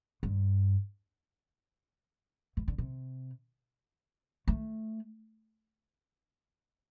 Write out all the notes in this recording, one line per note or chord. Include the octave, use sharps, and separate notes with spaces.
G2
E3
D3
C3
A3